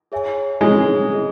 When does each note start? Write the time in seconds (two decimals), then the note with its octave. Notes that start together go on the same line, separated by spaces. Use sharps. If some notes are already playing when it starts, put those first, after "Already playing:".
0.12 G#4 C#5 E5 G#5
0.61 G#3 G#4 C#5 E5 G#5
1.10 E4 G#4 D#5